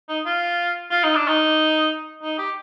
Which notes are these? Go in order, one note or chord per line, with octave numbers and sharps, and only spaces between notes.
D#4
F4
F4
D#4
D4
D#4
D#4
G4